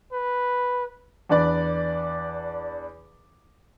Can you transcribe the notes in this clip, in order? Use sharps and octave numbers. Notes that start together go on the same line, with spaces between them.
B4
E2 D4 B4 D5